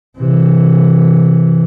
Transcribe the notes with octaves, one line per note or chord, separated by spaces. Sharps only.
C3 E3